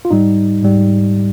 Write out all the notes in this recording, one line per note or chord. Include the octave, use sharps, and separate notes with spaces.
F4
G#2 G3 D#4
G#2 G3